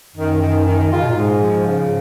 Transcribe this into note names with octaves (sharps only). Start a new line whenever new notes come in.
F#2 D#3
D#3
D#3
C#3 F4
B2
A#2
G#2 G#3
F3
C#3